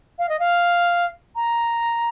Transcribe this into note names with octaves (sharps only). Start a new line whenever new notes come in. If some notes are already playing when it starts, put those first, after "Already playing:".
F5
D#5
F5
A#5